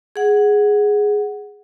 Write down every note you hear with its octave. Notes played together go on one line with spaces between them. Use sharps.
G#4 F#5